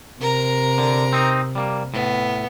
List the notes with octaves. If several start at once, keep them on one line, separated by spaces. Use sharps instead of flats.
C3 A#4 A#5
D3
C4 D#4
G3 A#3
A2 B3